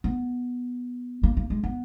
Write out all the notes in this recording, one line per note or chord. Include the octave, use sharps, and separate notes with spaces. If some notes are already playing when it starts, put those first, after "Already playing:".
B3
A#3
A#3
G#3
B3